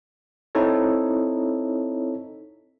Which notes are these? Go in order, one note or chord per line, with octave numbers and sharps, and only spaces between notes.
C4 D#4 E4 A4 C#5